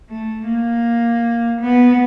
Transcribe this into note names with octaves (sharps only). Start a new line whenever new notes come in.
A3
A#3
B3